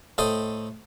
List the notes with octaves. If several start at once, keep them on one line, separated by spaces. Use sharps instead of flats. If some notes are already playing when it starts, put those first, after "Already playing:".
A2 A4 C5 D#5 D#6